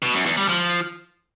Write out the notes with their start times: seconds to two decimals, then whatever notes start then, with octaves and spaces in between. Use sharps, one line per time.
0.02 B2
0.14 F#2
0.26 E2
0.37 G3
0.49 F3